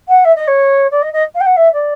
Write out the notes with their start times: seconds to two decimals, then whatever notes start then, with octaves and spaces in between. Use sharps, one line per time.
0.08 F#5
0.24 E5
0.35 D#5
0.47 C#5
0.91 D5
1.02 D#5
1.13 D#5
1.35 F5
1.40 G5
1.46 F#5
1.56 E5
1.73 D5